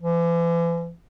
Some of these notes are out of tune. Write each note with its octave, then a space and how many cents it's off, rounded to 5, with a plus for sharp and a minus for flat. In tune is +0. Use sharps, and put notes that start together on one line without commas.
E3 +45